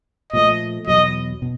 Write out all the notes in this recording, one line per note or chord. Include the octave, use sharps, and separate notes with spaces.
A#2 F3 A3 D#5
E2 B2 F#3 D#5
B2